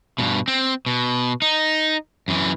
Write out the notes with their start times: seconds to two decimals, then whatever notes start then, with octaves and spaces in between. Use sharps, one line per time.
0.18 G2 B2
0.48 C4
0.86 B2
1.42 D#4
2.28 F#2 E3